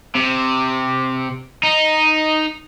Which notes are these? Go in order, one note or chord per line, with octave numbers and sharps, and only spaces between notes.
C3
D#4